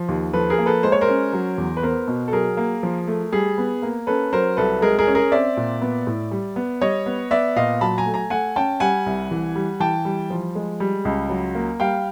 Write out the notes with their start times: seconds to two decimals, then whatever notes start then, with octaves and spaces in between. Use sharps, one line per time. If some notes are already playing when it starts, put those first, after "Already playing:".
Already playing: F3
0.08 D#2
0.33 F3 A4 B4
0.50 G#4 A#4
0.58 A#3
0.66 A4 B4
0.83 G#3 C5
0.92 C#5
1.01 A#4 C5
1.08 C#4
1.33 F#3
1.58 E2
1.77 B4
1.83 B3 A#4 C5
2.07 B2
2.28 A4
2.32 F#3 G#4 A#4
2.57 A#3
2.83 F3
3.07 A3
3.32 G3 G#4
3.58 B3
3.82 A#3
4.07 C#4 A4 B4
4.32 F#3 A#4 C5
4.57 C2 A4 B4
4.82 G#3 G#4 A#4
4.99 G#4 A#4
5.07 C#4
5.15 G#4 A#4
5.32 C4 D5 E5
5.57 A#2
5.82 B3
6.07 A2
6.31 G3
6.56 B3
6.82 G3 C#5 D#5
7.06 B3
7.31 B3 D5 E5
7.56 A#2 D#5 F5
7.81 F#3 A5 B5
7.98 G#5 A#5
8.06 A3
8.14 G#5 A#5
8.30 A3 F#5 G#5
8.56 C#4 G5 A5
8.80 G3 F#5 G#5
9.06 C2
9.31 E3
9.55 G3
9.80 E3 G5 A5
10.05 G3
10.30 F3
10.55 G#3
10.80 G3
11.05 C#2
11.30 F#3
11.55 A#3
11.80 G3 F5 G5